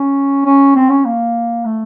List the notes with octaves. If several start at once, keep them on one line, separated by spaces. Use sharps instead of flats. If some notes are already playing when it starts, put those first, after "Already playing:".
Already playing: C#4
C#4
C4
C#4
A#3
A3